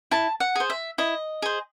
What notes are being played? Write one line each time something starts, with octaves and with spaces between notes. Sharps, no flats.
E4 A5
F#5
G#4 C5
E5
E4 D#5
G#4 C5